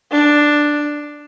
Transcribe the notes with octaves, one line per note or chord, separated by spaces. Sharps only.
D4